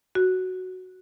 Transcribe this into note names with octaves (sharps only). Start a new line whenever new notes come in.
F#4